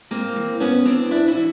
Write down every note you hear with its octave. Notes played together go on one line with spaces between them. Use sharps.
G#2 A#3 C4
E3
G#2 B3 C#4
E3 C4 D4
G#2 D4 E4
E4 F#4
E3